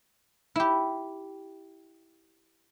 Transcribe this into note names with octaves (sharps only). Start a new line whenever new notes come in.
E4 G4